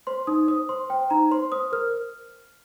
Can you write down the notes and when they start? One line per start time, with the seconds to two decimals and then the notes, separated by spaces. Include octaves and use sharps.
0.07 C5 C6
0.27 D#4 D#6
0.48 C5 D#6
0.69 C5 C6
0.90 C5 G5
1.10 D#4 A#5
1.31 C5 C6
1.52 C5 D#6
1.72 A#4 F6